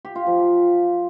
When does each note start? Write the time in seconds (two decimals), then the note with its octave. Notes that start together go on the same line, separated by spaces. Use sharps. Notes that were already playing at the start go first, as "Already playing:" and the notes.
0.05 G4
0.16 F4
0.26 F3